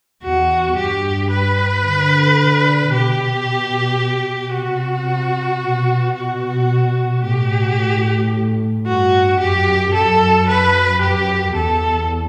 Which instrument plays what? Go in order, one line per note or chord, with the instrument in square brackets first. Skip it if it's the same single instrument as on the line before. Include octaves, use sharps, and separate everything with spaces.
[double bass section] E2 [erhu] F#4
[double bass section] G2 [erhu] G4
[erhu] B4
[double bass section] D3
[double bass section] B2 [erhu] G4
[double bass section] C3 [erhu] F#4
[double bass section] B2
[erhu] F#4
[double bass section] A2 [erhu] G4
[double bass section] A2
[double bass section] G2 [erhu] F#4
[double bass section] F#2 [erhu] G4
[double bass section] F#2 [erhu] A4
[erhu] B4
[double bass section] F#2 [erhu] G4
[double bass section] E2 [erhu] A4